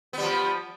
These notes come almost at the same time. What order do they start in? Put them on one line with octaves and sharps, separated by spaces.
B3 G3 F3